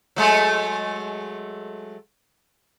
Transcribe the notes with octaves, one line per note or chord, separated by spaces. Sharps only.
F#3 G#3 A3